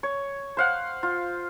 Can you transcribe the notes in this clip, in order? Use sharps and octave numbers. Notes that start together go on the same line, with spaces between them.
C#5
C5 F5 F#5
F4